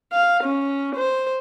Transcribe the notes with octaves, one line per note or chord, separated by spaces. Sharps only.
F5
C#4
C5